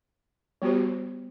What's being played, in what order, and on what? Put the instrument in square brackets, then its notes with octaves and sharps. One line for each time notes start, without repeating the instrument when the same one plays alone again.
[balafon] G3 B3 F#4 G4 C5